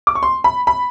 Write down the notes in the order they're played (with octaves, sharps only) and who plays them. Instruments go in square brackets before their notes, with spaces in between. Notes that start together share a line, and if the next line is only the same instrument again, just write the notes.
[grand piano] D6
C#6
C6
B5
B5